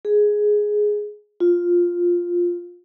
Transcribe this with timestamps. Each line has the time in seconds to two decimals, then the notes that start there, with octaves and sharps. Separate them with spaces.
0.05 G#4
1.40 F4